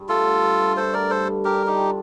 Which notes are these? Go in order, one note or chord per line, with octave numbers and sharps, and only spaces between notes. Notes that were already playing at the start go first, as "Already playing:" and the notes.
Already playing: G2
A3 F4 A4
D3
G2
G2
A3 A4 C5
D3 A#4 D5
G2 A4 C5
G2
D4 G4 A#4
G3
D#4 G4
F4